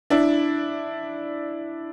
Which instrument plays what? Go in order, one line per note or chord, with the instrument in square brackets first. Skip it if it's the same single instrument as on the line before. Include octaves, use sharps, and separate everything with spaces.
[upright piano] D4 E4